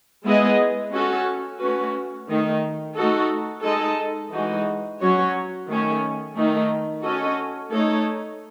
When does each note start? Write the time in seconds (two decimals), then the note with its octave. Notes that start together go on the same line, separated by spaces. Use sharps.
0.24 G#3 B3 E4 G#4 D#5
0.92 C#4 F#4 A4
1.59 A3 C#4 F#4 B4
2.28 D#3 A3 D#4
2.95 A3 D#4 F#4 A4
3.63 G#3 D#4 A4 D#5
4.32 E3 G#3 D#4 F#4
4.99 F#3 C#4 F#4 C#5
5.68 D#3 A3 C#4
6.36 D#3 A3 D#4
7.03 C#4 F#4 A4 D#5
7.71 A3 D#4 A4 C#5